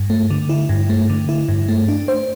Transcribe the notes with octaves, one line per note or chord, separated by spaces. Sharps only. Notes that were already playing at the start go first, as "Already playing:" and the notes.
Already playing: G2
A3
D3
E4
G2
A3
D3
E4
G2
A3
D4
C5